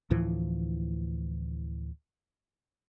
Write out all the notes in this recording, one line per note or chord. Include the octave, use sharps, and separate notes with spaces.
D2 A2 E3 F3